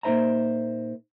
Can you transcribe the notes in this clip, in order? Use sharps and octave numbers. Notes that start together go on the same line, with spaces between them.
A#2 A#3 D#4 C5 E5 A#5